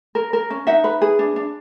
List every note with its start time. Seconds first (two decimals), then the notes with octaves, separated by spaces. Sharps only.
0.15 A#4
0.33 A#4
0.50 C#4
0.67 D#4 E5 F#5
0.84 B4
1.02 G#4
1.19 D4
1.36 D4